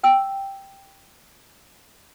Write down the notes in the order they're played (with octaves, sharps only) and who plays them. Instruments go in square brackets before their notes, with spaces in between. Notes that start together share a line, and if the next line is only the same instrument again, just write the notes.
[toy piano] G5 E6